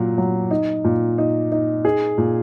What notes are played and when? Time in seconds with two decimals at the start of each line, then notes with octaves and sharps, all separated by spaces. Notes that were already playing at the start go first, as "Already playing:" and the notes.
Already playing: A#2 F#3
0.18 F#3
0.51 D#4
0.84 A#2
1.18 D#4
1.52 D#4
1.85 G#4
2.18 A#2